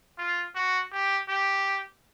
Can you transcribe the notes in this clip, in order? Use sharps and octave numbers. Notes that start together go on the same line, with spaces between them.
F4
F#4
G4
G4